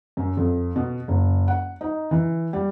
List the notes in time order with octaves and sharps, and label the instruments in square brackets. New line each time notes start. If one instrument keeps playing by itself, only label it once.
[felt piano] F#2
F2
B2
F#1
F#5
D#4
E3
G3